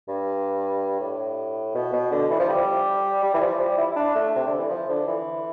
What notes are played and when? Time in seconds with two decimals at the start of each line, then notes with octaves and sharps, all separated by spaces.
0.08 G2
1.00 A2
1.75 B2
1.93 B2
2.11 D3
2.30 E3
2.40 F3
2.48 G3
3.23 G3
3.34 E3
3.41 F3
3.59 G3
3.78 E4
3.91 E4
3.96 D4
4.15 A3
4.36 C3
4.47 D3
4.58 E3
4.70 F3
4.89 D3
5.07 E3